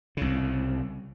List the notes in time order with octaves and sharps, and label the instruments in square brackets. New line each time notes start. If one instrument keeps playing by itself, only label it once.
[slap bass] C2 C#3